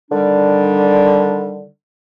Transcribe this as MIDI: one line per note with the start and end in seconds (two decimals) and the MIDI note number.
0.11 1.67 50
0.11 1.67 51
0.11 1.67 55
0.11 1.67 62